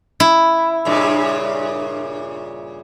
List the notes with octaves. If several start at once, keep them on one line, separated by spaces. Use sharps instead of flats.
E4
G2 A#2 C#3